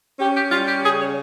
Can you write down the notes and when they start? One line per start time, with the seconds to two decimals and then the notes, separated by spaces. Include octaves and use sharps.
0.19 C#4 G4
0.36 G4
0.51 G3 F4
0.67 G4
0.83 C#3 G#4
0.99 C#5